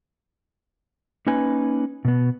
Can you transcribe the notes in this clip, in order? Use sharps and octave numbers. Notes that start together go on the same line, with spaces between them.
A#3 C#4 D#4 B4 G#5
B2 B3